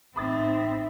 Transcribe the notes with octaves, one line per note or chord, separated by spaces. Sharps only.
A1 C4 D#4 E5 B5 D#6 A6